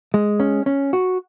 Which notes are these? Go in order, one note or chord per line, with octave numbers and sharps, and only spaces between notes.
G#3
C#4
C#4
F#4